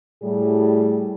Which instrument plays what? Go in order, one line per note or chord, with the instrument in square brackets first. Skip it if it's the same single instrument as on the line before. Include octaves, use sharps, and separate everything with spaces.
[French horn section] A2 G3 G#4